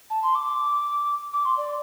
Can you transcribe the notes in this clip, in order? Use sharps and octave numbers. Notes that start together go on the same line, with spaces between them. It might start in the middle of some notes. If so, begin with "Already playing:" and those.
A5
C6
D6
D6
C6
D5